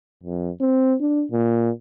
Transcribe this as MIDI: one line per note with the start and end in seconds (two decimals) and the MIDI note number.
0.23 0.50 41
0.60 0.95 60
1.01 1.24 62
1.32 1.70 46